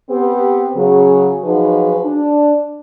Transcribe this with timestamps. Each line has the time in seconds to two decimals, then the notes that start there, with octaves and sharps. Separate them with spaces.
0.10 B3 C4 G4
0.76 C#3 F#3 G#4
1.44 F3 F#3 D#4 F#4 G#4 B4
2.05 D4